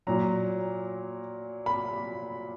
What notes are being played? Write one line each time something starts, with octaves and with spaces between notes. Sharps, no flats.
A#2 F#3 A#5
B5